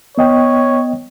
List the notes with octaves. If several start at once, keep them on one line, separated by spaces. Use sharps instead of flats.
B3 C#5 D#5 G5